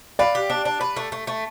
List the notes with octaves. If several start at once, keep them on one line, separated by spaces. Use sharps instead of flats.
B4 D5 F5
G4
D4
D4
B4
A3
A3
A3